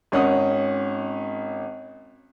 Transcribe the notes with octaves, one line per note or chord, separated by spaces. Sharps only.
G#1 C#4 F#5 D#6